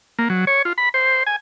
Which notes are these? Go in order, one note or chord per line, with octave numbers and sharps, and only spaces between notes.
A#3
F#3
C#5
F4
B5
C5
G#5